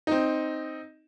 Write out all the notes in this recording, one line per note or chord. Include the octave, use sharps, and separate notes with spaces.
C4 D#4